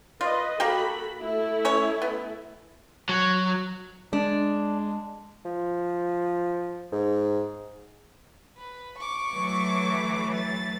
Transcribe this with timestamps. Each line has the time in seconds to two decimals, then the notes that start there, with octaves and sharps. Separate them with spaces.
0.21 F4 B4 D5 D#5
0.60 A#3 F#4 G4 A4 B5
1.21 A3 E4 A4
1.65 C#4 C#5
2.02 B3
3.09 F#3
4.13 G#3 D4
5.45 F3
6.92 G#2
8.58 B4
8.99 C#6 D6
9.33 E3 F#3 A3
10.34 A6